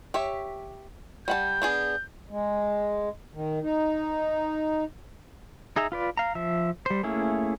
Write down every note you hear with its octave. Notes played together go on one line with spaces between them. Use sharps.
G4 C#5 E5
G3 F#5 A5 G6
B3 D4 G#4
G#3
D#3
D#4
D#4 G#4 E5 A#5
F4 B4 D5
F5 A#5
F3 E5
G3 C5
A3 A#3 C#4 E4 G#4